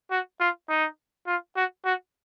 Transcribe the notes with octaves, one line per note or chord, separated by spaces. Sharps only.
F#4
F4
D#4
F4
F#4
F#4